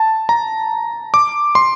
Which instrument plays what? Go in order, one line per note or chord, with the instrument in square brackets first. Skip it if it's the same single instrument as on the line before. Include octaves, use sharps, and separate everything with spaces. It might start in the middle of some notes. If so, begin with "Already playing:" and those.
Already playing: [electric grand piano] A5
A#5
D6
C6